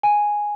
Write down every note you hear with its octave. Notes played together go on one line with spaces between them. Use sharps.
G#5